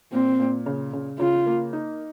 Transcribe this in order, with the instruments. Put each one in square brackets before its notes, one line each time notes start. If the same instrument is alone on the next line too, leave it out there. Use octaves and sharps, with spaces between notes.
[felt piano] A#2 [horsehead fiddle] C4
[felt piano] A#2
C#3
C#3
[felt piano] C#3 [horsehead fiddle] F4
[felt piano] A#3
D#4